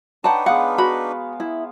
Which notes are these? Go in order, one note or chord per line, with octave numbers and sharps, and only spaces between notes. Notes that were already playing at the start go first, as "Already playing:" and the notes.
D4 D#4 B4 C#5 F#5 G5 A5 A#5
G#3 B3 F5 F#5
F#4 B5
E4